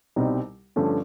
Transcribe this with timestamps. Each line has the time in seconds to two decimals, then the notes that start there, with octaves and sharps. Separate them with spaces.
0.16 C2 B2 G3 C4 D#4
0.76 G2 D3 F3 A3 C#4